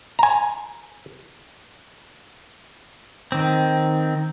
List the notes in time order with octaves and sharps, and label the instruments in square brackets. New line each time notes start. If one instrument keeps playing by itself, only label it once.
[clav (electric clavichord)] G#5 A#5
[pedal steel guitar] D#3 C4